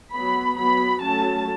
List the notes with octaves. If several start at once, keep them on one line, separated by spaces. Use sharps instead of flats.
F#3 B3 B5
F#3 B3 B5
F#3 A3 C#4 A5